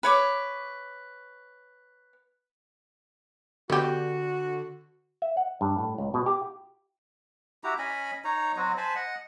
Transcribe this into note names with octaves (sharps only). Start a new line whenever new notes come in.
B4 C#5 D6
D3 B3 F#4 G4
E5
F#5
G2
A2
C#2
B2
G4
E4 F#4 G4 A#5
C#4 D#5 G#5 B5
D#4 C#5 A#5
F#3 C4 F#4 D#5
C5 G#5 A5 B5
D#5 F#5